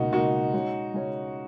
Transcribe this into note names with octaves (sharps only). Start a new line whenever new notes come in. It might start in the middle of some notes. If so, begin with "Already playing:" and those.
Already playing: C#2 B2 A#3 D#4 F#4
C#2 B2 A#3 D#4 F#4
C#3 G#3 C#4 F#4 C#5
C#3 G#3 C#4 F#4 C#5